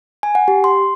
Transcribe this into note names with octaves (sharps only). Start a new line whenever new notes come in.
G#5
F#5
G4
C6